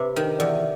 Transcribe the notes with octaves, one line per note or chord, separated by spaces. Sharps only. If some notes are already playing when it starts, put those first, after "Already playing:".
Already playing: C3 B4
D#3
E2 D5